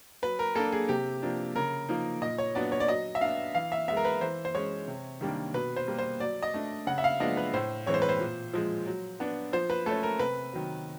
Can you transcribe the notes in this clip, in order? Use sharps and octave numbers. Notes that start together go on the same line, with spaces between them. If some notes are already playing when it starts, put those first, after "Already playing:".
F#3 B4
A#4
A#3 D4 A4
G#4
C3 G4
F3 A#3 D4
C#3 A#4
F3 A#3 D#4
A#2 D#5
C#5
F#3 B3 D4 D5
C#5
D5
F#3 D#5
E5
B3 D4 F5
E3 F5
E5
G#3 B3 E5
A#4
B4
E3 C5
C5
G#3 C#4 C#5
C3
D#3 G3 A#3 D4
B2 B4
C5
G3 A#3
C5
F#3 D5
D#5
A3 D4
C#3 F#5
E5
F5
F3 G#3 B3 D4 D#5
B4
A2 C5
E3 G#3 C4 C#5
C5
B4
C5
A#2
F3 G#3
F#3
B3 D4
F3 C5
B4
A3 C#4 A4
A#4
C3 B4
D#3 F#3